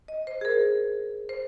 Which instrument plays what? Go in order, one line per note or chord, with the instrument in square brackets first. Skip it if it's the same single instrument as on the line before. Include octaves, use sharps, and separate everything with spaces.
[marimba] D#5
C5
G#4
A#4
C5